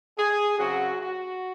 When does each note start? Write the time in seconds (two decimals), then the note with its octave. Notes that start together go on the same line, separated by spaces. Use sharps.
0.18 G#4
0.58 F#2 C#3 F#3 C4 F#4
1.01 F#4